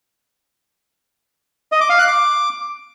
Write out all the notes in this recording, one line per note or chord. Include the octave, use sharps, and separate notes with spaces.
D#5
D6
F5
F#6
D6